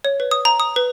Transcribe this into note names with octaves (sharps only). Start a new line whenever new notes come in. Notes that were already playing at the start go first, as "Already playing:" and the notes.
C#5
B4
D#6
A#5
D#6
B4